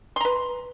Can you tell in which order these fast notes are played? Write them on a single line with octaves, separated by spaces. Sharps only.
C6 A#5 B4